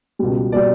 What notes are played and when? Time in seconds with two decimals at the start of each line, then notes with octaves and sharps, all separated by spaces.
0.19 C#2 B2 G3
0.52 B2 G3 D5